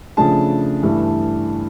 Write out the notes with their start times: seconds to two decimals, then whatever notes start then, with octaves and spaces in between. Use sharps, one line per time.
0.17 C#3 F3 A3 D4 A5
0.83 G2 E3 A3 D4